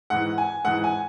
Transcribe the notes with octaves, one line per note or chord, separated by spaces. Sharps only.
G#2 E3 F#5
G#5
G#2 E3 F#5
G#5